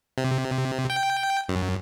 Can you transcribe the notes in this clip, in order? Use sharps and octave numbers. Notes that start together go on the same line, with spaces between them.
C3
G5
F#2